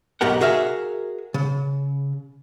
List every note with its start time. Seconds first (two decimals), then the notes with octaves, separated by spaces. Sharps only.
0.21 B1 G#2 G4 A#4 F#5
0.41 F#4 G#4 A#4 E5 F5
1.34 C#3